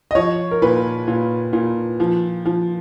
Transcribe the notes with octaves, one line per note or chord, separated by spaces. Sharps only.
D#5
F3 C#5
A#4
A#2 B4
A#2
A#2
F3
F3